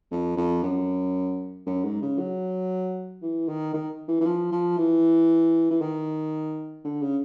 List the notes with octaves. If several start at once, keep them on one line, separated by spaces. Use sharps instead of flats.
F2
F2
F#2
F#2
G#2
C#3
F#3
E3
D#3
D#3
E3
E3
F3
F3
E3
E3
D#3
D3
C#3